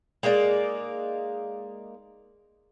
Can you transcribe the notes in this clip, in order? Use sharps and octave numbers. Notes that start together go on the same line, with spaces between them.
G#3 A#3 D#4 D5